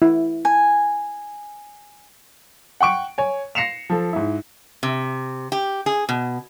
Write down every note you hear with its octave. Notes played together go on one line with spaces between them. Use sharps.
E4
G#5
F#5 G5 C#6 D7
C#5 G#5
A#6 C7 C#7 E7 F7
F3 A4
G#2 E4
C3
G4
G#4
B2